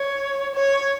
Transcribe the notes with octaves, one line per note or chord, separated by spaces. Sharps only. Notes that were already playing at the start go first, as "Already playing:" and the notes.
Already playing: C#5
C#5